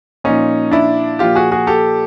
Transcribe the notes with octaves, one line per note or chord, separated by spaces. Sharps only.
A#2 F3 C#4 D#4
D4 E4
A#2 F3 F4 G4
F#4 G#4
F#4 G#4
G4 A4